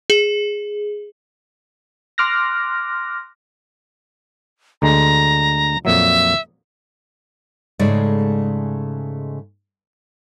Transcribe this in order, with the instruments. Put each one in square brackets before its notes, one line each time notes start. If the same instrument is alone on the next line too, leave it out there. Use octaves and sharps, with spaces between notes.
[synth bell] G#4
[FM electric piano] C6 D6 F6 F#6 A#6
[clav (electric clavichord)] D2 D3 G#3 [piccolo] A#5
[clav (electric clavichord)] F2 A#2 F#3 [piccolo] E5
[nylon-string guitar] G#2 C#3 G#3 A3 D5